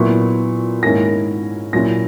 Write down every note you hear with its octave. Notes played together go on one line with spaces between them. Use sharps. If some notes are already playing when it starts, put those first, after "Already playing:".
Already playing: A#2 F#3 B3 E4 C#6
G#2 D#3 A#3 C#4 E4 A#6
A#2 F#3 C#4 E4 A#6